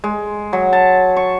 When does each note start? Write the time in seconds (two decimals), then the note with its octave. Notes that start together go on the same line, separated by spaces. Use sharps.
0.04 G#3
0.53 F#3
0.73 A5
1.16 C#6